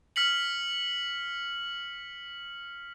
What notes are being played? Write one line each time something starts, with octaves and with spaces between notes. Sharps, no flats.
F6 B6 C#7 F#7